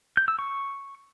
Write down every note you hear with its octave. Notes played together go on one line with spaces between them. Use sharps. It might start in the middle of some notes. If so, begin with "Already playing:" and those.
G6
E6
C#6